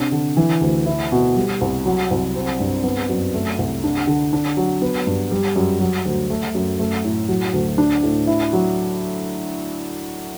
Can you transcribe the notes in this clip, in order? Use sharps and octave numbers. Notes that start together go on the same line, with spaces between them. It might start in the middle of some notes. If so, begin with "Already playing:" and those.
Already playing: C3 D4
D3
E3
D2
E4
B2
G3
C2
F#3
C2
C4
G2
B3
F#2
A3
C2
D4
D3
D4
F#3
B3
G2
G3
F#2
F#3
D2
A3
F#2
A3
A2
F#3
D2
D4
A2
E4
F#3